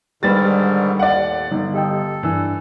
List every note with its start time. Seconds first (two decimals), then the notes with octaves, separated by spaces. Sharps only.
0.23 G#2 D3 D#3 G3 G4 B4 A6
0.99 D#2 A2 D5 F#5
1.52 G1 D#4
1.74 G4 A4 D#5 G5
2.23 G2 E3 D4 E6